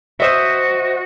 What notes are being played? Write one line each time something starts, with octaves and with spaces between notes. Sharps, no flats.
F#4 C5 D#5 E5